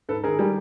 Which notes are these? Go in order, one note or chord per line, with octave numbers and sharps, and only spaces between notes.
G#2 A4 B4
D#3 G#4 A#4
G3